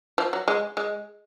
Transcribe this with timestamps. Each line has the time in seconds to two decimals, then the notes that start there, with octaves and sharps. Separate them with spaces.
0.18 F3
0.33 F#3
0.48 G#3
0.77 G#3